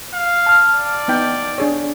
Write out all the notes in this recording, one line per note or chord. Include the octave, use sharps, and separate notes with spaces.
F5
A5 F6
D5
B3 D#4 G5
D4 G#4 C#5